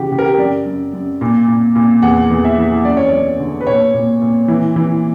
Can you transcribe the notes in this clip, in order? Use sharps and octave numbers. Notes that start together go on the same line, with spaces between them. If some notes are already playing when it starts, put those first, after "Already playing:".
Already playing: C#3 E3 F#4 G4
C#3 G4
A#4
G4
F#2 D5
F#2
F#2
A#2
A#2
A#2
E2 F#5
E2
E5
E3
F#2 D5
C#5
F#2 D5
D3
B4
A#2 C#5
A#2
A#2
E3
E3